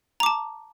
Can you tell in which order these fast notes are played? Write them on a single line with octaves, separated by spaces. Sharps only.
A#5 D6 A5